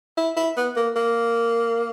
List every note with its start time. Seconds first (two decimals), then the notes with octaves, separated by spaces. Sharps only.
0.17 E4
0.37 E4
0.57 B3
0.76 A#3
0.96 A#3